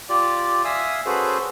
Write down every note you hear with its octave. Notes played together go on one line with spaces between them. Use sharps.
F4 G4 D5
E5 F5 G#5 D#6 E6
C#4 F#4 G#4 A4 B4 C5